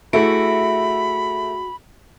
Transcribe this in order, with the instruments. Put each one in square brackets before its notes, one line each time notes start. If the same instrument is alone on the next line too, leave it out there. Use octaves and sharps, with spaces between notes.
[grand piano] A3 E4 [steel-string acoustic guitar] F#4 [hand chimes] G#4 E5 D7 [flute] B5